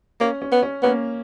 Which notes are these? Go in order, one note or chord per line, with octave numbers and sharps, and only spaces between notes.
A#3 C#4
C#4
B3
C#4
A#3 B3 C#4